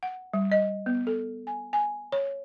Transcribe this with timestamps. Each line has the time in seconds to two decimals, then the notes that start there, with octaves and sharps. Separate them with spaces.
0.03 F#5
0.33 G3
0.51 D#5
0.86 B3
1.07 A4
1.47 G#5
1.73 G#5
2.12 C#5